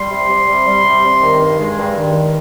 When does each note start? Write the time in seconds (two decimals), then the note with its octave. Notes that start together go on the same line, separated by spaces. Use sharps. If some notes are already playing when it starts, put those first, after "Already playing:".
Already playing: G3 C6
0.09 C3
0.29 C3
0.47 G3
0.66 G3
0.84 C3
1.04 C3
1.22 D#3
1.41 G2
1.59 G#3
1.78 G2
1.97 D#3